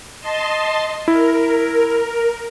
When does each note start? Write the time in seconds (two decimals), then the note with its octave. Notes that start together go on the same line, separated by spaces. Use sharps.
0.20 D#5 A5 C6
1.08 E4 A#4